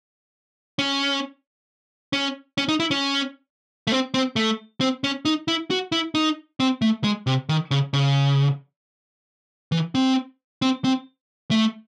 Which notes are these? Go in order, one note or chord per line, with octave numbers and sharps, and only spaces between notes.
C#4
C#4
C#4
D#4
E4
C#4
A3
C4
C4
A3
C4
C#4
D#4
E4
F#4
E4
D#4
C4
A3
G#3
C3
D#3
C#3
C#3
E3
C4
C4
C4
A3